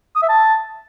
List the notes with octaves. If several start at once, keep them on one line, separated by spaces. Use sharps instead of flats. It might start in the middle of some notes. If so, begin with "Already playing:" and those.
D#6
E5
A5